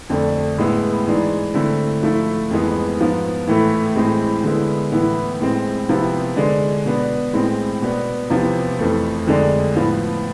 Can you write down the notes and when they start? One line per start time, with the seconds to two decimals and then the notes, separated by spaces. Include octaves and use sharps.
0.10 F2 D3 A3 D4
0.58 A2 G#3 B3 E4
1.06 G#2 E3 G#3 D4
1.54 D3 A3 C4 E4
2.02 G#2 F3 A3 E4
2.50 F2 E3 G#3 B3
3.00 G#2 F3 B3
3.47 A2 E3 A3 E4
3.96 A2 E3 G#3 C4
4.44 D3 G#3 B3 E4
4.92 A2 E3 B3 E4
5.41 A2 G#3 C4
5.89 C3 F3 B3 E4
6.37 D3 G#3 D4
6.86 B2 B3 D4
7.33 A2 G#3 C4
7.82 B2 B3 D4
8.30 E2 C3 F3 B3
8.79 F2 E3 A3
9.27 F2 D3 G#3 D4
9.75 A2 F3 B3